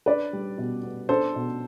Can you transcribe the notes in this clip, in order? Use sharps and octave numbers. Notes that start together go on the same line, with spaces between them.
D4 B4 D5
G3
B2
B3
D4 A4 C5
B2